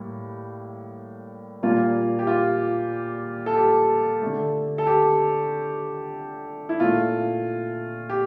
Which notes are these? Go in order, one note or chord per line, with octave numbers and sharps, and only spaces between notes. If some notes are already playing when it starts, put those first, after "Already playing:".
Already playing: A2 G3 A#3
A#2 G3 A#3 F4
G4
F4
A4
G4
D3 A3
A4
G4
E4
A#2 A3 F4
G4